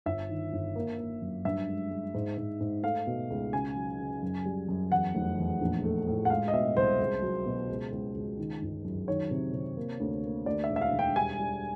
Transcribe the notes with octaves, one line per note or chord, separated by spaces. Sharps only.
G1 E5
D#3
G1
A#3
A#3
F#2
G2 E5
G#3
G#3
G#2
G#2
G#2
A3 F5
B2
C#2
C#3 G#5
F#3
C#3
F#2
G3
F#2
E2 F#5
F1
E2
A#1
A3
A2
F#5
G#3 F5
D#5
B2 E5
C2 C5
C#2
F#3
B2
C#2
C#2
C#2
D#3
G1
F#2
D#3 C#5
C3
C3
A#3
D2
A#3
D2 D5
E5
E1
E5
F5
E1
G5
G3 G#5
G3